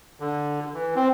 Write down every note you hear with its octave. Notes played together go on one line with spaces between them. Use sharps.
D3
E3
C4